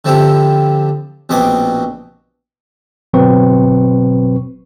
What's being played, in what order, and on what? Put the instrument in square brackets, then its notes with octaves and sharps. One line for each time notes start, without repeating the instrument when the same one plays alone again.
[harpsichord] D3 F3 C4 E4 G4
A#1 B2 B3 C4 D#5 D6
[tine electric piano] G1 B2 F#3 C4 B4 C#6